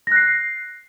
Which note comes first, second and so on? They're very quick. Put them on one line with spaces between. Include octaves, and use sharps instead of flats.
A#6 F#6 C7